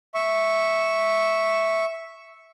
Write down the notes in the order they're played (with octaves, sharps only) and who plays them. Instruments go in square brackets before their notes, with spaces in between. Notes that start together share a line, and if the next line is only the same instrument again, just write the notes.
[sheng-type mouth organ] E5 C#6